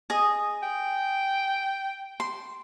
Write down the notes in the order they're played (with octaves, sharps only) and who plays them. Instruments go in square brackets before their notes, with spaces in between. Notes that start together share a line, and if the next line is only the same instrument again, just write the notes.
[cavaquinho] G#4 D#5
[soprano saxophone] G5
[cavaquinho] C6